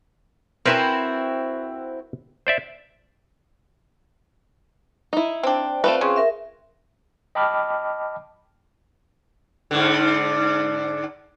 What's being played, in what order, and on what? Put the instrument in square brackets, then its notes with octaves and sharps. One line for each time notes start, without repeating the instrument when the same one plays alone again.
[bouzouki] C4 E4 F#4 [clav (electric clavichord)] A#4 B4 G#5
[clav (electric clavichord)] C5 D5 E5
[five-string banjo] D#4 E4
[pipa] C4 D4 [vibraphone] C5 D5 G5
[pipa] A3 [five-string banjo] C4 F4 B4
[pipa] C#3 [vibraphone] G#4 C6 C#6
[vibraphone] A#4 E5
[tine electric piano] D#5 G5 A5 B5 D6 F6
[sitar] G#2 D3